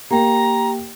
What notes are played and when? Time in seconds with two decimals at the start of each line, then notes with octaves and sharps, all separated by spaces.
0.11 A#3 G4 G5 A#5